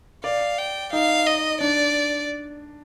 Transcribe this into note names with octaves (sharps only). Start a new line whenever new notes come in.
D5 F5
G5
D#4 F5
D#5
D4 D5